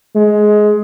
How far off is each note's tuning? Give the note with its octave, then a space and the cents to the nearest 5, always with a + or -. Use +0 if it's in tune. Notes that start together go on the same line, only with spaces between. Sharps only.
G#3 +15